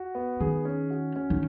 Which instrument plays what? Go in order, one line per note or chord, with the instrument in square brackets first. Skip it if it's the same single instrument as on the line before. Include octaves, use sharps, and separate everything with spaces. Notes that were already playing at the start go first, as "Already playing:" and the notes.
Already playing: [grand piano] F#4
B3
[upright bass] D#3 [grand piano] G#4
[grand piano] C#4
F#4
C#4
[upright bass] D#3